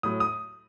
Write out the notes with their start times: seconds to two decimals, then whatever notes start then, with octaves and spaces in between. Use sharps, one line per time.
0.03 A2 F#3 D#6
0.20 D#6